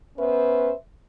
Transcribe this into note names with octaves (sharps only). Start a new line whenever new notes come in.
B3 C#4 B4 C5 E5